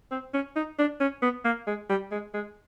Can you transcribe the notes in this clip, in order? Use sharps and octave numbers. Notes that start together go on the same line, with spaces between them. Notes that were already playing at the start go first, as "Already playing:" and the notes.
C4
C#4
D#4
D4
C#4
B3
A#3
G#3
G3
G#3
G#3